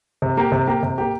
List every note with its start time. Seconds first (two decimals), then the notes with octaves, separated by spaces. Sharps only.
0.22 C3
0.37 A#3 G4
0.52 C3
0.67 A#3 G4
0.83 C3
0.98 A#3 G4